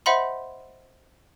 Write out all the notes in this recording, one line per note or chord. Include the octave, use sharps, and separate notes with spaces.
C5 D#5 E5 F#5 B5 C6